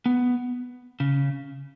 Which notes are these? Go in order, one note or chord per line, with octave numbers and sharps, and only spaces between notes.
B3
C#3